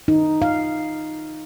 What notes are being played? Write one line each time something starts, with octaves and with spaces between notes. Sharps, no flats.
D#4
F5